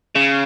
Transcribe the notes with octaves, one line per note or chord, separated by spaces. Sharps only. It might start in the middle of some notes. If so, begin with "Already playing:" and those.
C#3